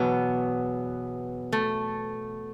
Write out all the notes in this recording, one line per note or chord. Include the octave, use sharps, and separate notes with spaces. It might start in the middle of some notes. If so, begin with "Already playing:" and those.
Already playing: E2 B2 F#3 B3
A3